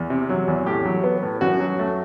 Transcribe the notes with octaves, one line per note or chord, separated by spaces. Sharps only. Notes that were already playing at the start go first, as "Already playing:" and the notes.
Already playing: E2
C3
F#3
E2
A2 G4
F#3
B3
A2
F#2 F#4
F#3
A3